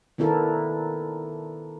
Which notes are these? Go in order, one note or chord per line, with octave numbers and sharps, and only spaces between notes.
D#3 B3 D4 E4 A4 A#4